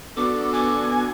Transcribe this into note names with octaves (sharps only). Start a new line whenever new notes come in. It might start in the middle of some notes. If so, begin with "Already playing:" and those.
B3 D4 F#4 A4 D6
G#5 D6